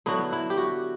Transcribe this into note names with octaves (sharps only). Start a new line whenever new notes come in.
D3 F#3 B3 E4 F#4
E4
G4
F#4